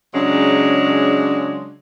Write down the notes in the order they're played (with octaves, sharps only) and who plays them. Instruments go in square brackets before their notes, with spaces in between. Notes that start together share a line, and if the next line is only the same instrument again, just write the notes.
[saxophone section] C#3 F#3 G#3 D4